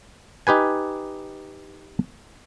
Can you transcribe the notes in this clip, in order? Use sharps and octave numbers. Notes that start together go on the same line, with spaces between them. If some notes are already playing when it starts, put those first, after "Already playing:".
D#4 G4 B4 G#5